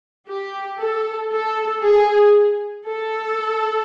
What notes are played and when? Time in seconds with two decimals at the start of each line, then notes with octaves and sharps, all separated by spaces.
0.27 G4
0.79 A4
1.32 A4
1.84 G#4
2.88 A4